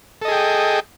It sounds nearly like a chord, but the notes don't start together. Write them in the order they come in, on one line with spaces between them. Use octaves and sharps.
A4 D#5 G#4 G5